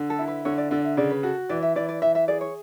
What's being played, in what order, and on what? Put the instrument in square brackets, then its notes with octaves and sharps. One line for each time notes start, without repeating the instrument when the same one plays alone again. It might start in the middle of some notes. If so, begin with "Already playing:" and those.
Already playing: [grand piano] D3
[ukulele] A4
[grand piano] E4
[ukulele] B4
[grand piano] D3 [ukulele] C#5
[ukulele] D5
[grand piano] D3 [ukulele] D5
[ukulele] E5
[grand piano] C#3 [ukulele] D5
[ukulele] B4
[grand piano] F#4 [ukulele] A4
[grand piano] E3 [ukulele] D5
[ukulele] E5
[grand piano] E3 [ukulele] D5
[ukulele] D5
[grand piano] E3 [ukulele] E5
[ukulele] E5
[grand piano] G#4 [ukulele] D5
[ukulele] C#5